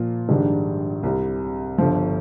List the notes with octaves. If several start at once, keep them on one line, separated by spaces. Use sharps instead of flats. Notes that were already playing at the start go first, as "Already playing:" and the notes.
Already playing: A#2 F3 A#3 F4
A#1 G#2 D#3 G3 D4
C2 C3 G3
G1 G2 D3 F3